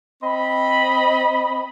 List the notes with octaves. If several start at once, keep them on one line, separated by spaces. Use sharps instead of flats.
C4 D#5 B5